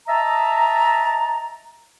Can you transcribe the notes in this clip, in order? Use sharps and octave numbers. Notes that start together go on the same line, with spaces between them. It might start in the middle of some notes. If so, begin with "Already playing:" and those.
D#5 E5 A5 A#5